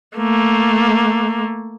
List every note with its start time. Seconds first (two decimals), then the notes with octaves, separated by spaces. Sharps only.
0.17 A3 A#3